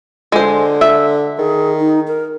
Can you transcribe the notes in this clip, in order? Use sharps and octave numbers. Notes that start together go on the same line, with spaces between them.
D3 G#3 C5
E5
D#3 G#4
D#4
A#4